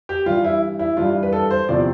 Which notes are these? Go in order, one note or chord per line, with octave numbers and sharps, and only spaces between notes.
G4
G2 E3 G3 F4
E4
E4
G2 E3 G3 F4
B4
A4
C5
E2 C3 F3 C4 D5